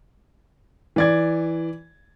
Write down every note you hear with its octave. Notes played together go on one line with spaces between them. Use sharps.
E3 D5 G#6